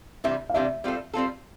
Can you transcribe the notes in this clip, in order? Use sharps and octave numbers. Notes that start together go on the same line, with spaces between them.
C3 E3 G3 D4 E5
F5
C3 E3 G3 D4 E5
G3 C4 F4 A4
G3 C4 F4 A4